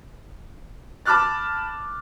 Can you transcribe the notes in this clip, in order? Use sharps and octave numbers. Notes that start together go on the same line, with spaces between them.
A5 B5 D6 F6 F#6 A6